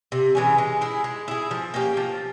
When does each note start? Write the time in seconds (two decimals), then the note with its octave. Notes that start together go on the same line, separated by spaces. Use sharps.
0.12 C3
0.35 E3 G#3 C#4
0.58 G#3
0.81 E4 G#4
1.04 G#3
1.28 E4 G#4
1.51 F3
1.74 A#3 C#4 G4
1.97 F3